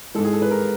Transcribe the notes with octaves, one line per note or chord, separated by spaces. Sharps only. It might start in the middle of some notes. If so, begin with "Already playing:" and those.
G#2 E3 G#3 A4
G#4
A4
B4
A#4